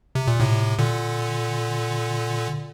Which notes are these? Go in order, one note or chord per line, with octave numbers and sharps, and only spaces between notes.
C3
A#2
A2 C3
A#2 D3